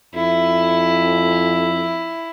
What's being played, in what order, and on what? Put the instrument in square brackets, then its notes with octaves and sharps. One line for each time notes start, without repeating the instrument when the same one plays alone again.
[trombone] F2 [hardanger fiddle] E4